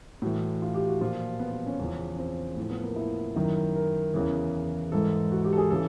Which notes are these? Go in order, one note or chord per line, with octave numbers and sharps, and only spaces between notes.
A2 E3 F#4
F4
G4
F#4
A#2 F3 F4
B3
B3
C#4
E2 C#3 F3 C#4
C4
A2 F3
B3
A#3
E4
F#2 D#3 E4
A#4
E2 C#3 E3
G#2 E3 A4
F#4
G4
A4
G#4
C#3 E3 A4